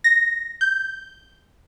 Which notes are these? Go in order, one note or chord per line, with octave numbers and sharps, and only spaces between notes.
A#6
G6